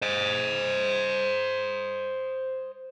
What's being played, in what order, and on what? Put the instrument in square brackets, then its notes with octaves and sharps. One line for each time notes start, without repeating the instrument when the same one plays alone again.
[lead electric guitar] C5 D#5